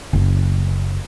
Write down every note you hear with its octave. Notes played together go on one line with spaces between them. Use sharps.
F#1